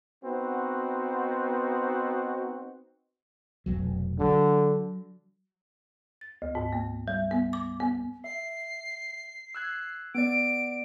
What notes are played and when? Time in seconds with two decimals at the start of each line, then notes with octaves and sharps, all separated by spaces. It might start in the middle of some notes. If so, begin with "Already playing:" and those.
0.23 B3 C4 D#4 F#4
3.66 F1 B1 F#3
4.19 D3 F#3
6.21 A6
6.42 D2
6.55 G#2
6.73 A#3
7.08 G3
7.31 B3
7.53 D6
7.80 B3
8.24 E5 C7
9.55 E6 F#6 G#6
10.15 B3 D5 D7